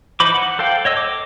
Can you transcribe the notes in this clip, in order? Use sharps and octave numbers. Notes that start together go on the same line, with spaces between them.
E3 D#4 C5 B5 D6
F#5
A4 C5 F5 G5
C#5 D#5 E6
D6